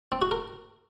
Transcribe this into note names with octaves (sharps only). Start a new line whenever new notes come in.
C4
F#4
A#4